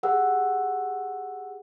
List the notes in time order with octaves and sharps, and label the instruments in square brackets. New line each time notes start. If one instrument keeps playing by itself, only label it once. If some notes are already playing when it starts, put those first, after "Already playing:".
[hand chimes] G4 G#4 F#5 E6